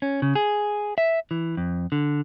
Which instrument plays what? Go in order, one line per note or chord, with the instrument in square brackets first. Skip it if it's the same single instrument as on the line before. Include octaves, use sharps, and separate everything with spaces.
[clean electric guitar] C#4
C#3
G#4
E5
E3
F2
D3